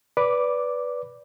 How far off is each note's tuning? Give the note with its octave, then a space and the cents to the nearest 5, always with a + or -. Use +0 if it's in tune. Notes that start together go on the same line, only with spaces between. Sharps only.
B4 -5 D5 -15 D6 +0